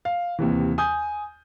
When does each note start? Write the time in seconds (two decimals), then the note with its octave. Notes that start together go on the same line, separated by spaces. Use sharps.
0.05 F5
0.39 D#2 C3 E3
0.78 G#5 D#6 G6